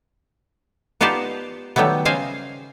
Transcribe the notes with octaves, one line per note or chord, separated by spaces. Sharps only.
B3 D#4 F4 G4 D5 A5
D#3 F#3 G3 A3 B3
C#3 C5 D#5 F5 G#5